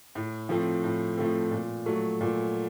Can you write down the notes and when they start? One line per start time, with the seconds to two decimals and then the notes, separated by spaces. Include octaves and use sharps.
0.15 A2
0.49 F3 A3 C4
0.84 A2
1.17 F3 A3 C4
1.51 A#2
1.86 F#3 A3
2.21 A#2